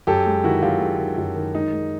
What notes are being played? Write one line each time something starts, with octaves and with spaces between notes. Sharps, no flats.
F#2 G4 A4
G#3
D#3 E4 F#4
F#2 F4 G4
G#3
D#3
F#2
D#3
G#3 D#4
G#3